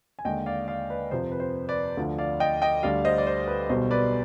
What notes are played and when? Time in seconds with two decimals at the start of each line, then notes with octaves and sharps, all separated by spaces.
0.19 G#5
0.25 D#2 D3 G#3 D#5 G5
0.46 D5 F5
0.68 D5 F5
0.90 B4 D5
1.11 F2 C3 F3 C5
1.32 B4
1.40 C5
1.69 B4 D5
1.97 D2 D3 F3
2.18 D5 F5
2.40 D#5 G5
2.62 D#5 G5
2.83 D2 D3 G3 D5 F5
3.05 C5 D#5
3.18 D5
3.27 C5
3.48 B4
3.69 B1 B2 G3 C5
3.91 B4 D5